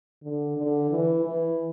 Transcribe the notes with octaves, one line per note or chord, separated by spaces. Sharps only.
D3
D3
E3
E3